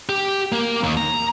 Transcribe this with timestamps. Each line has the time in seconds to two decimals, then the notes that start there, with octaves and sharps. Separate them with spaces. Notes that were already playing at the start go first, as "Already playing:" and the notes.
0.09 G4
0.52 A#3
0.83 D#2
0.97 A#5